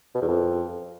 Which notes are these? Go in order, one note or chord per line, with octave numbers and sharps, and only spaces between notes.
B2
E2
F2